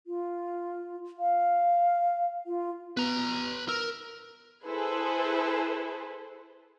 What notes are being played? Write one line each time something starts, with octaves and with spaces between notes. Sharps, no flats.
F4
F5
F4
B3 B4 A#5
A#4 E6
E4 G#4 A4 B4 C5